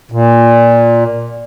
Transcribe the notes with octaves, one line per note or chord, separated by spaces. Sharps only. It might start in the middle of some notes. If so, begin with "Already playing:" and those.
A#2